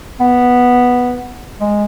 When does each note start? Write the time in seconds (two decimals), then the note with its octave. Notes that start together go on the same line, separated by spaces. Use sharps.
0.20 B3
1.61 G#3